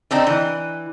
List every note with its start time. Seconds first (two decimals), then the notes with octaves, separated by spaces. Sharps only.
0.11 D3 C4 D4 D#4
0.27 E3